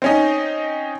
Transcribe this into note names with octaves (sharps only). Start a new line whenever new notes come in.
C4 C#4 D#4